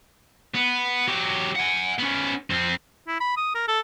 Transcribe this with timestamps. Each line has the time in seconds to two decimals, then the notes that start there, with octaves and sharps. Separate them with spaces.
0.55 B3
1.07 F#3 G4
1.56 F#5 G#5
1.99 B3 C#4
2.50 F2 C4
3.08 E4
3.20 B5
3.37 D#6
3.55 A#4
3.68 A4